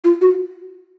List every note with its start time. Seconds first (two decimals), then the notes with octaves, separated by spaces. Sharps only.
0.04 F4
0.21 F#4